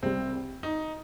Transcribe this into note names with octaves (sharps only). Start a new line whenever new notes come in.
C2 C3 G3 C4
D#4